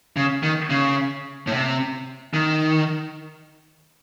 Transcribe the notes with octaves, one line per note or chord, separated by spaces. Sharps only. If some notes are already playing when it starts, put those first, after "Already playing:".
C#3
D#3
C#3
A2
C3
D#3